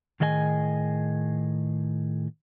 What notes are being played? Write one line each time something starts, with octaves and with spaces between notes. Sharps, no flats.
A2 D#3 G#4 D#5 F5 G#5